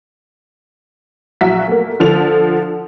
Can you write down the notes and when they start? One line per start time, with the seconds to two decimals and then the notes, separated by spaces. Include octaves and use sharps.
1.41 A#1 F#3 F#4 E5 B6
1.68 A3 A#3
2.00 D3 F3 A4 F7